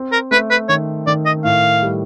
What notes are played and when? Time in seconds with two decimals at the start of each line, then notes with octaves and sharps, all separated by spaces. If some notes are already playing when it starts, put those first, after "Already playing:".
Already playing: C4
0.12 A#4
0.31 A3 B4
0.51 B4
0.69 D#3 C#5
1.07 D#3 D5
1.26 D#5
1.44 A2 F5
1.82 G3